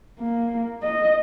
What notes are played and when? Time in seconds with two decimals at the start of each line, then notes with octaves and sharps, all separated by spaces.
0.19 A#3
0.83 D#5